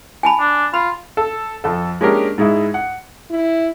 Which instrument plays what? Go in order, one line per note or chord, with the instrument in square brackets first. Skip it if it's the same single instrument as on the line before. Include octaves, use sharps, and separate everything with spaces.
[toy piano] G#5 A5 B5
[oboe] D4
[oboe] F4 [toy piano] B5
[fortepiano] A4
F2 A4
G#3 A#3 C#4 D4 G4 A#4
G#2 G#3 E4
F#5
[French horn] E4